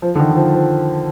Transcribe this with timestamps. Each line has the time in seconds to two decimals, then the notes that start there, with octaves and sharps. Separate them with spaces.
0.02 F3
0.15 D3
0.20 D#3
0.31 D#3
0.36 F3
0.53 F3